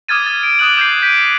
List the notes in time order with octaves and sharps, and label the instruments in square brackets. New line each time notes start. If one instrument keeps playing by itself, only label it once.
[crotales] D6 D#6 F6 G#6 A6 D#7
A6
D7
D6 D#6 F#6 F#7
D6 G6 A6 C7
G6 B6 D7 D#7